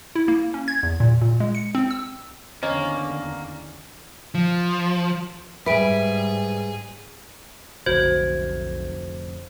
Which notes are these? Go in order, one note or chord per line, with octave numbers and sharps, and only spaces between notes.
E4
A#3
C#4
G#6
E2
A#2
A#2
G#3
C#7
C4
E6
E2 D3 D#3 A#3 C#4 D#5
F3
G#2 G3 G#4 B4 E5 D7
F1 B1 A2 D3 F#4 C5 G6 G#6